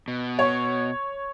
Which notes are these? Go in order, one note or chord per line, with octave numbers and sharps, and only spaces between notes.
B2
C#5